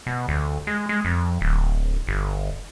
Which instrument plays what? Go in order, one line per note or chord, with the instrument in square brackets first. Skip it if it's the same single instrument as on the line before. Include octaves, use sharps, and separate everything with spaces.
[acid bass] B2
D2
G#3
G#3
F2
D1
G1